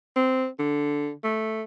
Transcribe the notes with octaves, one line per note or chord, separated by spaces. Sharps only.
C4
D3
A3